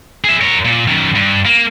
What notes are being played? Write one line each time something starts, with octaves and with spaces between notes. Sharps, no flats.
G#4 E5
A#4 C#5
A#2
F#2 D#3
G2
A#3